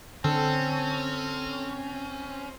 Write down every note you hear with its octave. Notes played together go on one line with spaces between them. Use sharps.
D3 C4 C#4 A4